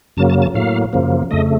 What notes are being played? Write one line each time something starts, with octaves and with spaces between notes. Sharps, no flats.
F#2 C#3 F#3 A#3 A5
A5
A5
A2 F#3 A#3 F5
F#2 C#3 F3 A#3
F2 C#3 A3 D#5